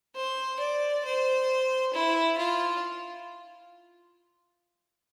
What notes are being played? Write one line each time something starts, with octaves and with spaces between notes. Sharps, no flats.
C5
D5
C5
E4
F4